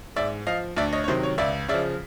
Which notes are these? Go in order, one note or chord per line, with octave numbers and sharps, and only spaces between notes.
G#2 D5 E5
F3 D#5 F5
D2 D5 E5
C#5 D#5
C#5
C3 D#3 F#3 C5
C#5
C#2 D5 E5
C#3 D5 E5
F3